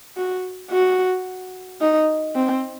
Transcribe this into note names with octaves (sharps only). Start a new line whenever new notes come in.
F#4
F#4
D#4
C4